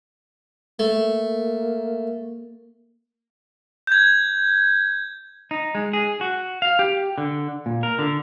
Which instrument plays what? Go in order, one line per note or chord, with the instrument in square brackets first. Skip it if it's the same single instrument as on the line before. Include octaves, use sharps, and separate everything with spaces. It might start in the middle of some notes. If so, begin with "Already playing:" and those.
[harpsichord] A3 [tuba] A#3
[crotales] G6 G#6
[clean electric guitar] D#4
G#3
G#4
F#4
F5
G4
D3
A#2
A#4
D3